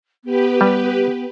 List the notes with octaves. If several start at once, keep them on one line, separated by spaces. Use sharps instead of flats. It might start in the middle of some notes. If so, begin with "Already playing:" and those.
B3 G4 B4
G3